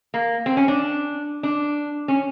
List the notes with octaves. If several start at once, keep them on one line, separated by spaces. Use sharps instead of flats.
A#3
C4
C#4
D4
D4
C#4